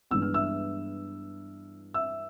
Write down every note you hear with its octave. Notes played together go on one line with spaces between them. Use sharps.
G2 E3 G#3 B3 E6
F6
E5 E6
E5 E6